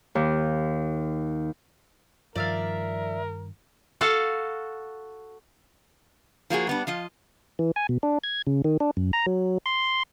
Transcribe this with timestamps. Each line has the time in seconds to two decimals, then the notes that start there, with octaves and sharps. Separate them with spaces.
0.15 D#2
2.36 G2 D#3 F3 A#4 D5 E5 F5
4.01 F#4 A4 F5 F#5
6.50 F3 A#3 F#4 G#4
6.67 G3 B3 D4
6.87 F3 F4 D#5
7.59 E3
7.76 G#5
7.89 B2
8.03 D4
8.24 G#6
8.47 C#3
8.64 D#3
8.80 D4
8.97 F#2
9.13 A#5
9.26 F#3
9.66 C6